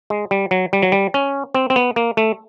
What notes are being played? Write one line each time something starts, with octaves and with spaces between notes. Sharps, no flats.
G#3
G3
F#3
G3
F#3
G3
C#4
C4
C4
B3
A#3
A3